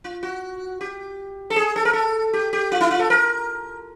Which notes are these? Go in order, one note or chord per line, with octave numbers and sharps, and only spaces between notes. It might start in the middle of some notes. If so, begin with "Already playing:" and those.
F4
F#4
G4
A4
G#4
A4
A#4
A4
G4
G4
F4
E4
F4
A4
A#4